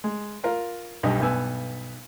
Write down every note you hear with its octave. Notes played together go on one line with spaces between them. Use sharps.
G#3
F4 A#4
B1 G2 G4 D#5
B1 G2 B3 G#5 E6